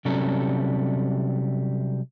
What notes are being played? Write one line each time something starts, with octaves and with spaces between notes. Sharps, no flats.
C3 F#3 G3 C#4 A4 A#5